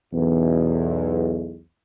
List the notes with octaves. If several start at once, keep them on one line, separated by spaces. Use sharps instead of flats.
B1 E2